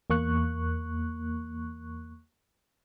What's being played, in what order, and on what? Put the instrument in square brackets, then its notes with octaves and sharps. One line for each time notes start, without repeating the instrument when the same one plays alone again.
[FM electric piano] E2 A#3 C#6 F#6